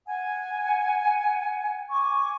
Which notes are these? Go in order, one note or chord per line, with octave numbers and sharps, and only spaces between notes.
F#5 G#5
G#5 C#6 D6